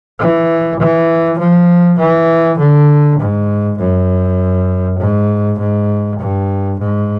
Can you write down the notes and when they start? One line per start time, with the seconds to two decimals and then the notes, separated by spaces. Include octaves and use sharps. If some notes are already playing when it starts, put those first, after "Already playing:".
0.19 E3
0.79 E3
1.39 F3
1.99 E3
2.59 D3
3.19 G#2
3.79 F#2
4.99 G#2
5.59 G#2
6.20 G2
6.80 G#2